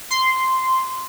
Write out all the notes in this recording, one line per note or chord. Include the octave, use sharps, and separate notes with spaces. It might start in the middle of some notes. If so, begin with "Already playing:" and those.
C6